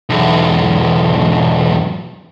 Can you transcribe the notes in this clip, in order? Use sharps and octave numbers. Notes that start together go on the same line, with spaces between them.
B1 E2